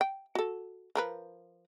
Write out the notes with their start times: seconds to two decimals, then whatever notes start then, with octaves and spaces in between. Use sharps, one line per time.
0.01 G5
0.35 F#4 A4
0.95 F3 A#4 B4